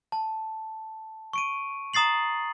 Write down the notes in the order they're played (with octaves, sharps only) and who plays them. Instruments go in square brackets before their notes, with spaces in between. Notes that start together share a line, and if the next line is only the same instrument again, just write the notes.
[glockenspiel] A5
C#6 D7 D#7
A#5 D#6 A6 C7 F#7